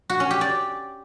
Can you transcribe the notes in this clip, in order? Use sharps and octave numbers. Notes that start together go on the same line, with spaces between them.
F#4
C#4
G4
D5